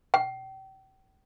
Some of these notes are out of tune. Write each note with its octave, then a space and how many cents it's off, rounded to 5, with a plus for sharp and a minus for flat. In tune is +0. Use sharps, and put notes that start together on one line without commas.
G5 -35